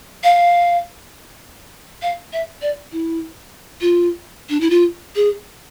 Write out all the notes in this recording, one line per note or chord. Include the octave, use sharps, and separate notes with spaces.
F5
F5
E5
D5
E4
F4
D4
E4
F4
G#4